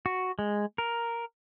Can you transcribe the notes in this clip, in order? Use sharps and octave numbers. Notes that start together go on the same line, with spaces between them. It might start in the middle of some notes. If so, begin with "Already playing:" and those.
F#4
G#3
A#4